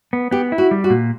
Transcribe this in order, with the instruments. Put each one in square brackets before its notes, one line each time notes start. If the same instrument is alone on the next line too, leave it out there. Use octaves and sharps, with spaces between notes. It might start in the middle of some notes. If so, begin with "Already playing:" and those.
[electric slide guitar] B3
[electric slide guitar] B3 [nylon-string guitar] G4
[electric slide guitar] E4
[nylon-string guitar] F#4
[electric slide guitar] G3
[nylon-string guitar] F#4
[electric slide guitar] A#2